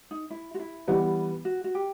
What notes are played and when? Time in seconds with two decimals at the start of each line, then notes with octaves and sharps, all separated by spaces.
0.11 D#4
0.30 E4
0.54 F#4
0.60 E4
0.88 E3 G3 B3
1.45 F#4
1.64 F#4
1.75 G4